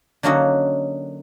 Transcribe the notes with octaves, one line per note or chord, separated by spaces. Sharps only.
D3 F#3 A#3 C#4 D#4 F#4